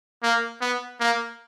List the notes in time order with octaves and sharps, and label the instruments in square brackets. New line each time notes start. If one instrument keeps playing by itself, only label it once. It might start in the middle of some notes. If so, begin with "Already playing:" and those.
[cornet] A#3
B3
A#3